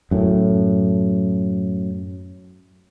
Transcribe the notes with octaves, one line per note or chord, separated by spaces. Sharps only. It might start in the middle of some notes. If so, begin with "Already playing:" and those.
F#2 A2